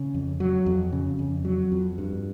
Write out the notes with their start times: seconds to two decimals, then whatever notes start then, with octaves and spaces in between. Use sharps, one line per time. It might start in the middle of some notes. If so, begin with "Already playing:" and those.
Already playing: C#3
0.14 F2
0.40 F#3
0.66 F2
0.92 C#3
1.19 F2
1.45 F#3
1.72 F2
1.98 G2